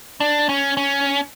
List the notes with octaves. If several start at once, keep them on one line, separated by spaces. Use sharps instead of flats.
D4
C#4
C#4